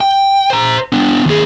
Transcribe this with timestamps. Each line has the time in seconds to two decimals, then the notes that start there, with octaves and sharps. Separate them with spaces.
0.01 G5
0.50 C5 A#5
0.92 B3 D4
1.26 D#2 G#4